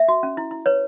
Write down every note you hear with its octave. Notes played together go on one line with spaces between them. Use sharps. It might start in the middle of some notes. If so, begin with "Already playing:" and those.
Already playing: E5
F#4
C#4
E4
E4
B4 C#5